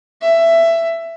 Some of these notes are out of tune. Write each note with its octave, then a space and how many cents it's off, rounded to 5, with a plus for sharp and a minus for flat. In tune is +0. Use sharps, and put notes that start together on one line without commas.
E5 +15